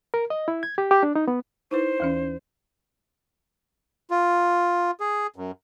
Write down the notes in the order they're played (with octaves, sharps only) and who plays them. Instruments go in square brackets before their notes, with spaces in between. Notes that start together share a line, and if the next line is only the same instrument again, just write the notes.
[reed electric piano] A#4
D#5
E4
G#6
G4
G4
D4
D#4
B3
[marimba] D#4 E4 B4 [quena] C5
[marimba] D#2 E3 C#4
[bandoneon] F4
G#4
F#2